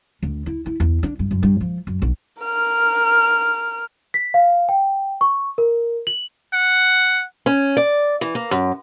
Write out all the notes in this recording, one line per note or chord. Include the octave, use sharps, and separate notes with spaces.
D2
E4
E4
E2
D4
G2
F#2
G2
F3
F#2
B1
A#4 F6
B6
F5
G5
C#6
A#4
F#7
F#5
C#4
D5
E3
A#3
F#2